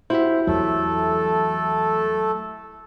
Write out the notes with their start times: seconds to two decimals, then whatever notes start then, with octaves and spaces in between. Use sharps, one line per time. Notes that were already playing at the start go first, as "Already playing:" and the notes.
0.10 E4 F#4 G4 C5 E5
0.47 E2 F#3 A3 A4